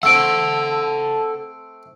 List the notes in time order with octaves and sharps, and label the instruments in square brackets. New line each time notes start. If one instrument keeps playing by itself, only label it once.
[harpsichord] A3 C4 [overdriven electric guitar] A4 F#5 [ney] A5 [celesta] E6 D7